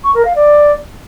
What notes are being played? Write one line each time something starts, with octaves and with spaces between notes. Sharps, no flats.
C#6
A#4
F5
D5